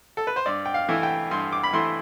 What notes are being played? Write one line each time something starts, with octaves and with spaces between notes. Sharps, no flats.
A4
B4
C5
G2 D5
G5
F5
E3 A3 E4
G5
G2 C6
D6
B5
E3 A3 E4 C6